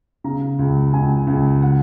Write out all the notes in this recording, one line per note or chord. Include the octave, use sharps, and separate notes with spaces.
C#3 A#5
C#2
C#2 G#5
C#2
F#5